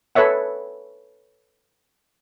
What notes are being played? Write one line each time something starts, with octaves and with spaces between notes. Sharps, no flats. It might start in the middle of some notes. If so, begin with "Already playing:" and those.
A4 B4 C#5 E5 F#5